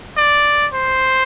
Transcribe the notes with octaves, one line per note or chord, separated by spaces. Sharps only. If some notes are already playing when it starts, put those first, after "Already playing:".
D5
C5